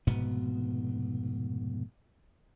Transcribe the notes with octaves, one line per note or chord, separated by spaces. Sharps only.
F1 G#2 B2 B3